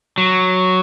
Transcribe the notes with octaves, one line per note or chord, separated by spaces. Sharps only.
F#3